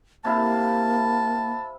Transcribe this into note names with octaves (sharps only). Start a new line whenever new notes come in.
C3 A#3 E4 F5 A5